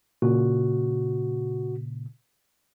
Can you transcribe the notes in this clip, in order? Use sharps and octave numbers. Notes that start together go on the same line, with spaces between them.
A#2 C#3 F#4